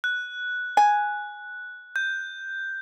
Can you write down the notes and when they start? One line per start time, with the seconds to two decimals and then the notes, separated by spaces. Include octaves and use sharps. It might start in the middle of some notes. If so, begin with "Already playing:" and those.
0.04 F#6
0.77 G#5
1.96 G6